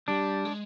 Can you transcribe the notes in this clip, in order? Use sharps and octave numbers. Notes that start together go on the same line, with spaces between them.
G3 D4
G#3